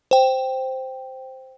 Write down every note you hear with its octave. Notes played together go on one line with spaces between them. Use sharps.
C5 G5